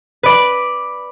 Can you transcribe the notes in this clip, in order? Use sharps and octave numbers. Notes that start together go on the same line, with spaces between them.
B4 D5